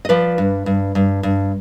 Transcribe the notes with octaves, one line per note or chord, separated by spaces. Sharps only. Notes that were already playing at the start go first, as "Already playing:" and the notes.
D#5
F3 B4 D5
G2
G2
G2
G2